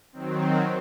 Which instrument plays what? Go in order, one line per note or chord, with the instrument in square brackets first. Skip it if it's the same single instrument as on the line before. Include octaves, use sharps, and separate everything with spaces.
[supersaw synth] D#3 F#3 C4